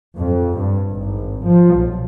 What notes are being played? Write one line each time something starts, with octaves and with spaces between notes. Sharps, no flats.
F2
G2
G#1
F3
B1